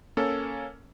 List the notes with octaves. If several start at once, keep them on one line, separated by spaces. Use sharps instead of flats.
A#3 C#4 A4